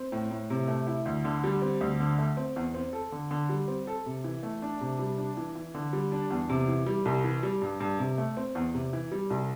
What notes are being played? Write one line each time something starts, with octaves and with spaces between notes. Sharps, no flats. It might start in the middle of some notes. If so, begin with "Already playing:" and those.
Already playing: C4
A2
A2
C3
A3
E4
D2
D3
G3
C4
D2
D3
A3
C4
E2
C4
A4
D3
D3
G3
C4
A4
C3
E3
A3
D4
C3
G3
D4
E3
E3
D3
G3
D4
E2
C3
E3
G3
C2
E3
G3
G2
G2
C3
A3
C4
E2
C3
E3
G3
C2